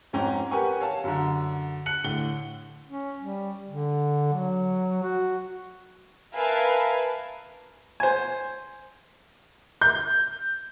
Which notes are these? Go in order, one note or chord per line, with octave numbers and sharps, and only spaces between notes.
F2 G#2 C#4 G5 A#5
G4 A#4 B4 F#5 G#5 C#6
C#5 F5 A5
F#2 D3
F#6 C#7 F#7
A2 D3 G7
C#4
G3
D3
F#3
F#4
A#4 B4 E5 F5 G#5 A5
C5 G#5
G6